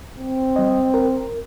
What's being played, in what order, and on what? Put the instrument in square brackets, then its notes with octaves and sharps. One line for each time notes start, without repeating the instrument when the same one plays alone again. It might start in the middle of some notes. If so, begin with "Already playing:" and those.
[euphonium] C4
[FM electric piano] G3 D#5
A#4